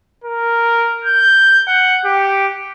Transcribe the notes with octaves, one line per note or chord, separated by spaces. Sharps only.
A#4
G6
F#5
G4